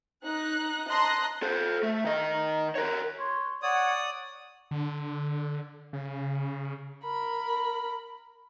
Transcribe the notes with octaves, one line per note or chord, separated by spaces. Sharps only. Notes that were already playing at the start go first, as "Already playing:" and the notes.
D#4 F#6
D#5 A5 A#5 C6 F#6
A4 C5
A3
D#3 D#5
A#4 C#5
C#5 C6
C#5 D5 F#5 D#6
D3
C#3
A#4 B5